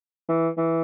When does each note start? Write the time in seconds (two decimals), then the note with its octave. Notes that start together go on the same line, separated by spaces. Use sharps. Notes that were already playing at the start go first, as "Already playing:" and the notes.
0.29 E3
0.58 E3